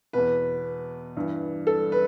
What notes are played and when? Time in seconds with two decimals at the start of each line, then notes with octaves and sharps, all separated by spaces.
0.13 E2 B2 B4
1.17 G2 E3
1.67 A4
1.92 B4